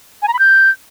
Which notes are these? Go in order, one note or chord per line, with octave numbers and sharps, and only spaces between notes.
G#5
A#5
B5
G6